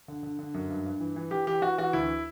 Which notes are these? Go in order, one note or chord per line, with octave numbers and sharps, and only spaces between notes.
D3
D3
D3
F#2
G2
G2
E3
E3
E3 G4
E3 G4
E3 F#4
E3 F#4
D2 E4